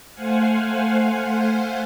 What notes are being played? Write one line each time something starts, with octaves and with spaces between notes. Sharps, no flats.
A3 C5 F5 F#5 G#5